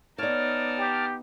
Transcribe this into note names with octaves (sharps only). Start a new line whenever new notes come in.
B3 D#4 C#5 D5 A5 D6 F6
G4